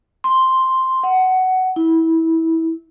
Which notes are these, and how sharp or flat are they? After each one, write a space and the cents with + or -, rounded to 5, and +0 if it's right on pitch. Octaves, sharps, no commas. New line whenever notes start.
C6 +0
F#5 +15
E4 -20